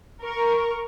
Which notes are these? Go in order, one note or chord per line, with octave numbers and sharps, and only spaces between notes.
A#4 C#6